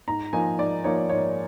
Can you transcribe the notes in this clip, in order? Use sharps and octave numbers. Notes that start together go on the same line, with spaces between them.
G#2 A#5
F3 A#3 D#4 G#5
G#2 D5
F3 A#3 D#4 C#5
G#2 C#5